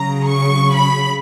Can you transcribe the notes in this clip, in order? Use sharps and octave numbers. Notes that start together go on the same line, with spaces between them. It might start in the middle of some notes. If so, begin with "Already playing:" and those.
Already playing: C#3 F#3 A#5
C#6
B5